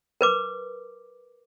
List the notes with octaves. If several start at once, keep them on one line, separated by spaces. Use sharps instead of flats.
A#4 B4 D6